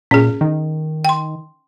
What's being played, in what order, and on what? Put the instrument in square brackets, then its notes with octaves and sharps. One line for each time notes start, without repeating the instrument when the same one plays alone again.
[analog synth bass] A#2 [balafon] C#4 G#4
[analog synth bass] D#3
[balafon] G5 C6